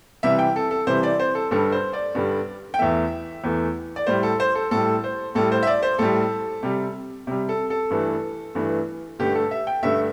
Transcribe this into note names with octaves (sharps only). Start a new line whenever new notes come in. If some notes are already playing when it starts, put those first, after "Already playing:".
C3 E3 G3 E5
G5
A4
A4
C3 E3 G3 C5
D5
C5
A4
G2 D3 G3 A4
C5
D5
G2 D3 G3
G5
E2 E3 A3 E5
E2 E3 A3
D5
A2 G3 C5
A4
C5
A4
A2 G3 A4
C5
A2 G3 A4
C5
E5
D5
C5
A2 G3 A4
C3 G3
C3 G3
A4
A4
G2 E3 A3
G2 E3 A3
G2 D3 A3 G4
A4
E5
G5
G2 D3 A3 E5